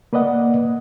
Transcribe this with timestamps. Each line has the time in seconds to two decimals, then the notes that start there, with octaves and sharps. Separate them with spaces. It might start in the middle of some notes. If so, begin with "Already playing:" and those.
0.13 A#3 B4 D5 D#5 F#5